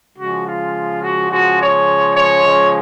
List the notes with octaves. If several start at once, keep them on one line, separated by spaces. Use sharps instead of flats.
C#3 F3 G#3 F#4
F4
F#4
C#3 F3 G#3 F#4
C#5
C#5
C#3 F3 G#3